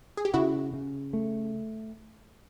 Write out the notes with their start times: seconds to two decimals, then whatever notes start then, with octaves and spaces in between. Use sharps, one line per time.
0.17 G#4
0.25 G4
0.34 C#3 E4 F#4
0.73 C#3
1.13 A3